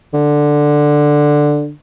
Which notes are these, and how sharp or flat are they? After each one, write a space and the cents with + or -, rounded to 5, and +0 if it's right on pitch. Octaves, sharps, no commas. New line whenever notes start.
D3 +5